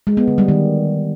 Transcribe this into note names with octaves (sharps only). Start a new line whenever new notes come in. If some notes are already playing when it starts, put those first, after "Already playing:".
G#3
B3
D3
G3
D#3